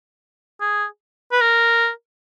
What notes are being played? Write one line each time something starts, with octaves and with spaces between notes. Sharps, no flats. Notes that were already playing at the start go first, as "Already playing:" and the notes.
G#4
B4
A#4